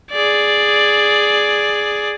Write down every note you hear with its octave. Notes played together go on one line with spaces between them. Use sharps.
G#4 D5